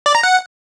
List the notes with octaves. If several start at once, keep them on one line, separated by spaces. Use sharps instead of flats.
D5
A#5
F#5